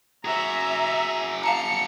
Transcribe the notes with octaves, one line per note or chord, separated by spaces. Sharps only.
F#4 G#4 E5 A#5
F5 A5 A#5 C#7